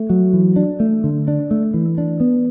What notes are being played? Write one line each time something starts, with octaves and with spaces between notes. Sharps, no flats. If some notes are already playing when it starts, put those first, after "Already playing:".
Already playing: A3
F#3
E3
D4
A3
D3
D4
A3
E3
D4
B3